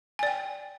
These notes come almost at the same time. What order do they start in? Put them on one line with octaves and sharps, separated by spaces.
G#5 D5 G5